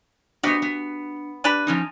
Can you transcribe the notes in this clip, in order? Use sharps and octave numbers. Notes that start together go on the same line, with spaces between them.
B3 D4 F#4 G4 C5 D#5 C#7
B3
D4 G4 B4 D#7
F3 C#4 D#4